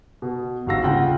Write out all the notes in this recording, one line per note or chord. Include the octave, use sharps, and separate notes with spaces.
B2
G1 G#2 F#4 F5 E6 A#6
D#1 C#3 F4 F#5 G5